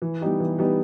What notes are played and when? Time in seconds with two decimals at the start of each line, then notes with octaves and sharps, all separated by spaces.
0.02 E3
0.21 G3 B3 D#4 G4
0.40 E3
0.59 G3 B3 D#4 G4